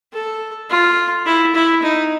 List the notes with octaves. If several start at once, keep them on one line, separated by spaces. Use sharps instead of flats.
A4
F4
E4
E4
D#4